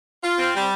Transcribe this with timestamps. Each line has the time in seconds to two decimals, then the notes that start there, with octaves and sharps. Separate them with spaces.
0.24 F4
0.39 C4
0.54 G3